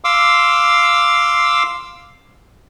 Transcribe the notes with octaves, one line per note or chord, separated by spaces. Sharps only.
F5 C6 D6 E6